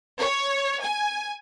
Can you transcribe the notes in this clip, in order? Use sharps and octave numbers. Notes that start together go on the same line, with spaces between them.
C#5
G#5